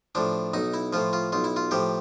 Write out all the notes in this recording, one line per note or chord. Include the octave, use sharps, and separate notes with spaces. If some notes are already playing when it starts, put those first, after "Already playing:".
A2 F3 D4
B1 D#4
E4
A2 F3 F4
F4
B1 F4
E4
F4
A2 F3 G4